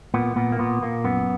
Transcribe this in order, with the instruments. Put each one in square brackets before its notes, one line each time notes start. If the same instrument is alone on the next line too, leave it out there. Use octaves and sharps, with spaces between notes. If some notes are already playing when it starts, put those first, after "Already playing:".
[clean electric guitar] A#2 B3
A#2 B3
A#3
A#2 B3
A#2 A#3
F#2 B3